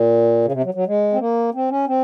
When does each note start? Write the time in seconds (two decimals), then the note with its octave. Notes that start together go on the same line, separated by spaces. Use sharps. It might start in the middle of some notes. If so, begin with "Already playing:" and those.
Already playing: A#2
0.45 C#3
0.52 C3
0.64 F#3
0.74 F#3
0.87 G#3
1.13 C4
1.20 A#3
1.54 C4
1.70 C#4
1.87 C4